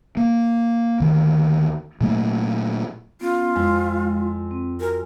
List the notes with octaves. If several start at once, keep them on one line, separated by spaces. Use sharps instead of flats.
A#3
D2 D#3
A#2 F#3 A3 A#3
B3 C#4 F4
F2 G#3 E4
C4
F#4 A#4 G#5